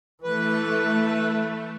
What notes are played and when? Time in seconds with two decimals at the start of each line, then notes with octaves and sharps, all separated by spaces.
0.23 E3 A3 B4